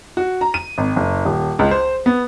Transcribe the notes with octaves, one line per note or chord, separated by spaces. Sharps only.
F#4
A#5
D#7
G#1
F#1
D#1
C#2
C5
B3